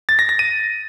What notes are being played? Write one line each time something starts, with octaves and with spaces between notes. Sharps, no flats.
A6
A#6
A#6
D#7